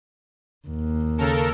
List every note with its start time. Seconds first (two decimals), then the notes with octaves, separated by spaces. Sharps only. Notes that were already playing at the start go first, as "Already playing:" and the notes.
0.67 D#2
1.18 C#3 A4 A#4